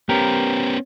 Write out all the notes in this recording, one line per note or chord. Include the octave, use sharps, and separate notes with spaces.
B3 C#4 G4 A#4